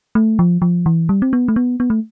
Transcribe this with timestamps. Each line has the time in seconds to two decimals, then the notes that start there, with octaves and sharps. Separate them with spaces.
0.15 A3
0.39 F3
0.62 F3
0.86 E3
1.09 G3
1.22 C4
1.33 B3
1.48 A3
1.56 B3
1.80 B3
1.90 A3